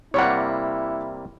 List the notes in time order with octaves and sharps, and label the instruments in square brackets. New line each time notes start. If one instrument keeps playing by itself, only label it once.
[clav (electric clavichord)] C3 G3 A#3 [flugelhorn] E4 [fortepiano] C#5 F#5